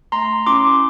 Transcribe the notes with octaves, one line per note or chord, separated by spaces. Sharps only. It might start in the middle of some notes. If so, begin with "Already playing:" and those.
A3 A#5 C6
C#4 E4 C6 D6